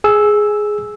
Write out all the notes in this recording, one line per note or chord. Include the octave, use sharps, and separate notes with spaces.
G#4 E6